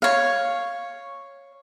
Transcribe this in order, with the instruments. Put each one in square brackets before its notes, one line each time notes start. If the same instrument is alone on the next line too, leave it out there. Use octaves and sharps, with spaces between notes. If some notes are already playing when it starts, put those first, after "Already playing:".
[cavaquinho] C#5 F5